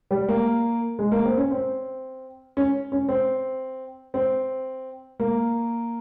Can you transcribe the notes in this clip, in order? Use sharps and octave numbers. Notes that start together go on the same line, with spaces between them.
G3
A#3
G#3
A#3
C4
C#4
C4
C#4
C#4
C4
C4
A#3